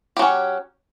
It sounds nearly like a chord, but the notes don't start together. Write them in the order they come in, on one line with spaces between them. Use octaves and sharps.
G4 F#3 C#4